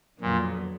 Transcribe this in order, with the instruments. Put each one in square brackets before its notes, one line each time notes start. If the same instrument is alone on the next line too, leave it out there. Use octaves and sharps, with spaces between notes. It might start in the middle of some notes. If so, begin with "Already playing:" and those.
[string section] F2 D3 F#3 B3 [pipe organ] A#2